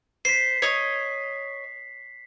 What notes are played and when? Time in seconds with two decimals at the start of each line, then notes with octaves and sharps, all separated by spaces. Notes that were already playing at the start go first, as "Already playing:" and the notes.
0.25 C5 B6 C7
0.62 C#5 D#5